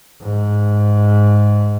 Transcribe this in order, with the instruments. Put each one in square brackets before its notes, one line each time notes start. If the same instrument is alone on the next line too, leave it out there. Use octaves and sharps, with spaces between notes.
[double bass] G#2